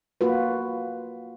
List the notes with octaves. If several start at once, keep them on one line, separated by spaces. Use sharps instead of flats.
A#3 F4 F#4 B4